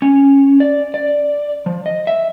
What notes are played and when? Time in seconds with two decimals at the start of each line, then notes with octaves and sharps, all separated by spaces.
0.02 C#4
0.60 D5
0.94 D5
1.66 F3
1.86 D#5
2.07 E5